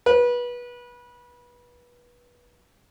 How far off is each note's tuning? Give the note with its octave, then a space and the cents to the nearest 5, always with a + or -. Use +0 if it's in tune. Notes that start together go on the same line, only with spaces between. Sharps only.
B4 -25